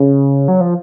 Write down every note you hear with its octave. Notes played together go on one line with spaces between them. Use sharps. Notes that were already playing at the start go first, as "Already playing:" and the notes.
Already playing: C#3
F#3
F3